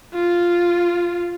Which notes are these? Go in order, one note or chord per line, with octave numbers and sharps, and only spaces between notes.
F4